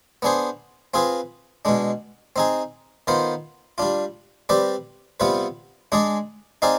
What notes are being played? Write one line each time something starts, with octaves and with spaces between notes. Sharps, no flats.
B3 D4 G#4 C5
C4 F4 G#4 B4
B2 G#3 D4
C4 D#4 G#4
D#3 B3 F4 C5
G3 D4 F4
G3 C4 G4 B4 D5
C3 G3 B3 F4 B4
G#3 D4 G#4 D5
C4 D#4 G#4 D5 F5